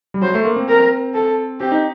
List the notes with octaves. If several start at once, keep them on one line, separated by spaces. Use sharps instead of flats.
G3
F#3 C5
A3
A#3
C4
A#4
A4
C4 G4
D#4